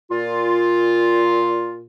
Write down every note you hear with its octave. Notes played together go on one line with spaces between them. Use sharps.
A#2 F4